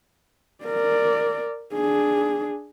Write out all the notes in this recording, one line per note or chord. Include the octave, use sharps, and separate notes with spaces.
A#4 D5
D4 G#4